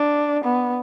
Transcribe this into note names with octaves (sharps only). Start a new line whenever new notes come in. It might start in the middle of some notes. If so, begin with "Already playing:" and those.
Already playing: D4
B3